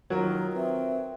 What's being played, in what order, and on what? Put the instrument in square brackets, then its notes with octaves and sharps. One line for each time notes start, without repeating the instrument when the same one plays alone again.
[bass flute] D#3 [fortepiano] F#3 [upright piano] F4 A#4
[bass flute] C4 [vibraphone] B4 E5